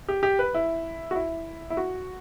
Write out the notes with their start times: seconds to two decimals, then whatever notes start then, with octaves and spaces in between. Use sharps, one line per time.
0.09 G4
0.23 G4
0.39 B4
0.54 E4
1.11 F#4
1.15 E4
1.70 E4
1.77 F#4